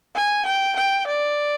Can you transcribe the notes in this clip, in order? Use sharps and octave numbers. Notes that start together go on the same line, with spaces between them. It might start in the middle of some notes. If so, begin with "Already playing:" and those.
G#5
G5
G5
D5